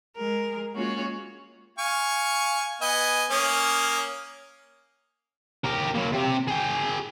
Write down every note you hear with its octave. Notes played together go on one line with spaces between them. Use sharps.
G#3 A#4
G#3 A#3 C#4 F4 F#4 C#5
F5 G#5 C#6
B3 D#5 G#5
A#3 C#4 D#6
G4 A#4
F#3 A#3
C3 G4
G#4 G5